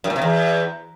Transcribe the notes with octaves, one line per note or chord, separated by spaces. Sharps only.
F#2
A#2
C3
E2